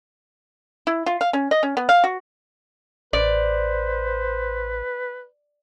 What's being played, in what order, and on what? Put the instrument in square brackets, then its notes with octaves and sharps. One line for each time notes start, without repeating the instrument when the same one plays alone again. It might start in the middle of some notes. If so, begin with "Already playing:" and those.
[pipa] E4
F4
F5
C#4
D#5
C#4
B3
F5
F#4
[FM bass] A1 [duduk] B4 [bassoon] C5 [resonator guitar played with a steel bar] D5